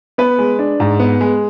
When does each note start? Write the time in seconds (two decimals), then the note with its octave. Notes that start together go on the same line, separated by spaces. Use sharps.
0.18 B3 B4
0.38 G#3
0.59 D4
0.80 G#2
1.00 B3
1.21 G#3